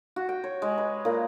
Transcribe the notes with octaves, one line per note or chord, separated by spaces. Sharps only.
F#4
G5
C#5
G#3
B4
A#2